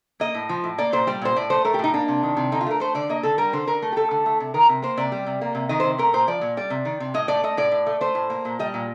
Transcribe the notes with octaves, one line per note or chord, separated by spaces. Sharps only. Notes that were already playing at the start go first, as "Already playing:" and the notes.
A#3 D#5
A2
F3
A2
A#3 D5
A#2 C5
G3 D5
A#2 C5
A2 D5
A3 C5
A3 A#4
G4
A2 D#4
A#3 D4
C3
D#3
C3
D3 D#4
F4
A3 A#4
A3 C5
D3 D5
A#3 D#5
D3 A4
G3 A#4
D3 C5
D3 A#4
A3
G4
A3 A4
D3
A3
C3
D#3 A#4
C3
A#3 C5
C3 D5
G3
C3
A#3
C3
D#3 D#5
C3 C5
A3 A#4
A#2 C5
F3 D5
A#2
G3 D5
C3
D#3
C3
A2 D#5
A3 D5
A3 D#5
A2 D5
A2
A3
A3 C5
A2
A#3
A#2
G3 D#5
A#2